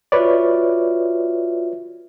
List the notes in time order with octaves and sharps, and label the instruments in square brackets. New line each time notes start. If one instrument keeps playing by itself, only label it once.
[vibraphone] F4 F#4 E5 [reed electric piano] B4 C#5 D5